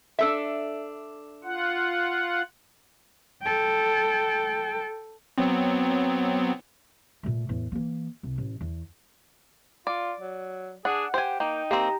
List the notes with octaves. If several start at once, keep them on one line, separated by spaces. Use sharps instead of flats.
D4 A4 E5
F4 F#5
A4 G5
F#3 B3 C4
A#2 A3
E2 A2
E3 A#3
C2
A1
E2
F4 D5
F#3
D4 G#4 F#5
G4 C5 G#5
A#3 D#4 G5
A#3 C4 G4 A#5